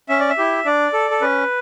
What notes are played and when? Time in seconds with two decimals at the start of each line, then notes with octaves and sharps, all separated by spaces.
0.09 C#4 E5
0.20 D5
0.29 E5
0.38 E4 G4
0.65 D4 D5
0.93 A4
1.11 A4
1.21 C#4 B4